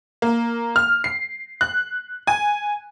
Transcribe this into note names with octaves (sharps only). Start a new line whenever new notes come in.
A#3
F6
C7
F#6
G#5